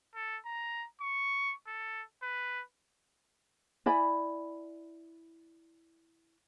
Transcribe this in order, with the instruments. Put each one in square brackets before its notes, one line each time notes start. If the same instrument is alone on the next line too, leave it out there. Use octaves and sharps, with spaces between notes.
[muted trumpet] A4
A#5
C#6
A4
B4
[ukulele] E4 D5 G#5 B5